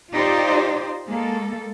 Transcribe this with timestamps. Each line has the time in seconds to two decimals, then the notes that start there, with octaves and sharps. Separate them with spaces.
0.14 D#4 F4 G4 C5 D5
1.09 G#3 A#3 A4